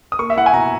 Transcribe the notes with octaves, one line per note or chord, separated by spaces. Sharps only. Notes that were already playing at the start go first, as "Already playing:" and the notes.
D#6
A#3 C#6
E5
E4 F#5
G#5
B2 A#5